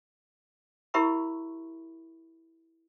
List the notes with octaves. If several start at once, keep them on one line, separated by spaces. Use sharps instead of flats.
E4 G4 A#4 E5 B5 C#6